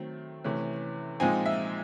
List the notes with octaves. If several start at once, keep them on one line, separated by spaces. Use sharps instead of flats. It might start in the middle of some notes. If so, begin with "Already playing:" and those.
Already playing: D#3 F#3 A3 C4
C3 E3 A3 C#4
A#2 F3 G#3 C4 D#4 G#5
E5